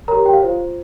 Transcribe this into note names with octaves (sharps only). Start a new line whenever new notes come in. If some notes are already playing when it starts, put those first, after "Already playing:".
G4 A#4 C#5 A#5
G4 G5
F5
F4 C5